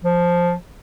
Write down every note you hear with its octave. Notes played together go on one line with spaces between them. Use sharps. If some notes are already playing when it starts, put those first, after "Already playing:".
F3